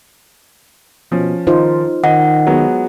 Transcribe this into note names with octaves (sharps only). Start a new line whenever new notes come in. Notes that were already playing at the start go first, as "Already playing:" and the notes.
B2 F3 C#4
D#3 D#4 F4 C5
D#3 D#5 F#5
F#3 G#3 B3